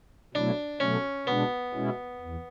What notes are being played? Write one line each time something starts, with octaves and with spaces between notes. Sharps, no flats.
B2 F#3 A3 D4 E4
B2 F#3 A3 C#4
B2 G#3 B3 D4
B2 G#3 C#4 E4
E2